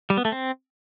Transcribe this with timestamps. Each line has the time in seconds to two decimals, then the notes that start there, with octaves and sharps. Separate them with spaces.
0.10 G3
0.17 B3
0.25 A3
0.32 C4